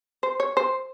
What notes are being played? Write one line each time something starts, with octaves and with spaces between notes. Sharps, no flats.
C5
C#5
C5